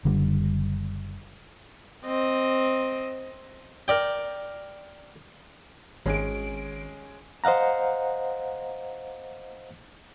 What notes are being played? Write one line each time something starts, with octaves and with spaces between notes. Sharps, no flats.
F#1 D3 G3
C4 D#5
A#4 D5 G5
G#1 G#3 C#4 G#4 D7
C5 D#5 F5 F#5 A#5